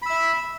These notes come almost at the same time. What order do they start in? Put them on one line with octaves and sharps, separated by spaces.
B5 E6 E5